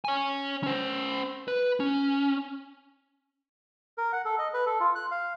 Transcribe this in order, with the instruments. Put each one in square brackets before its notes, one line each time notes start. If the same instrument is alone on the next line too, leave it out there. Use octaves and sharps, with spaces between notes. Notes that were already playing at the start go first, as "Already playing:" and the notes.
[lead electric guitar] C#5 G#5
C#4 C5
B4
C#4
[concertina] A#4
F#5
A4
D#5
B4
A4
F4
F#6
F5